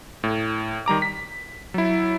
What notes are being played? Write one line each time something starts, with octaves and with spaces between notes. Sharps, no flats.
A2
D#3 G3 A#5 D6
B6
F#3 E4